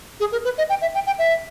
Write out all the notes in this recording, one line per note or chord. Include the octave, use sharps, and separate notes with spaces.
G#4
A#4
B4
D#5
G5
E5
G5
G5
E5